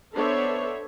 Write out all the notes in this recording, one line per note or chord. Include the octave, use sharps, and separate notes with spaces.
B3 D4 A4 C5 C#5 E5